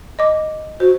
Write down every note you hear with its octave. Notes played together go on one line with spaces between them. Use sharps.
D#5 D6
F#4 C5